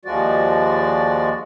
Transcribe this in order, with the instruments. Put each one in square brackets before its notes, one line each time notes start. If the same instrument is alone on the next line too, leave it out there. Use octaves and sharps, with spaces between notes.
[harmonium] D#2 F3 G#3 F#4 D5